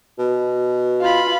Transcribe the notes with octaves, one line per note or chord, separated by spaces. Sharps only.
B2
F4 B5